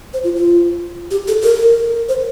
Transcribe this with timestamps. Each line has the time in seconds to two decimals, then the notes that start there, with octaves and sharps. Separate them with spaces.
0.14 C5
0.24 F4
0.36 F4
1.11 G4
1.28 A4
1.44 A#4
2.09 C5